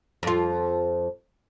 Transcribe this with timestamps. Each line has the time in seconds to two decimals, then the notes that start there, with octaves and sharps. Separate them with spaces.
0.23 F2 F4